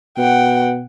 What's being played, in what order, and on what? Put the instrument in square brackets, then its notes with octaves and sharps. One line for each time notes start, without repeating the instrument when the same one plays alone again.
[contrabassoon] B2 [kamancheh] F#5 G5